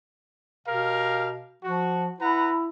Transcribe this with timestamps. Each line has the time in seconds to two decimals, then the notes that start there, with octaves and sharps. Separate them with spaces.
0.67 B2 G4 A#4 F5
1.64 F3 F#4
2.20 E4 B4 F#5 A#5